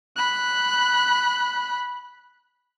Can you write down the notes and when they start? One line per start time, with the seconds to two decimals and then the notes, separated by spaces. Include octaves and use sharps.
0.17 B5 F#6